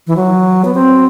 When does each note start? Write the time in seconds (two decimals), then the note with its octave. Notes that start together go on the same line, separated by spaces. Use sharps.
0.07 E3
0.16 F#3
0.65 B3
0.74 C4